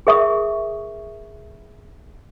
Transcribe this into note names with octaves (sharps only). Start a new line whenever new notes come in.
G#4 A#4 E5 C#6 D#6